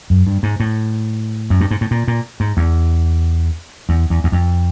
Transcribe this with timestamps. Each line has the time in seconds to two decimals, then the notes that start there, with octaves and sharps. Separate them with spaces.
0.10 F#2
0.27 G2
0.43 G#2
0.60 A2
1.50 F#2
1.61 G2
1.71 G#2
1.81 A2
1.91 A#2
2.08 A#2
2.40 G#2
2.57 E2
3.89 E2
4.10 E2
4.24 E2
4.32 F2